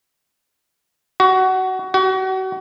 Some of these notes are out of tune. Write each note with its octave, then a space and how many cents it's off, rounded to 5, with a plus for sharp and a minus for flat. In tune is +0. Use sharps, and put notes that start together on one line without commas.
F#4 +20
F#4 +35